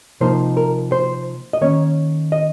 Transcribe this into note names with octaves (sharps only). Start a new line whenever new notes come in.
C3 F3 A#3 D#4 C5
A#4
C5
D#5
D#3 A#3 C#4 C#5
D#5